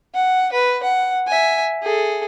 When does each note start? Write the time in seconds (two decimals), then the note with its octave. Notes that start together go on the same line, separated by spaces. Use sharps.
0.14 F#5
0.53 B4
0.83 F#5
1.27 E5 G#5
1.83 G#4 A4